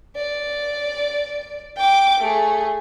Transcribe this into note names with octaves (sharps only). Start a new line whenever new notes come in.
D5
G5 D6
A3 G#4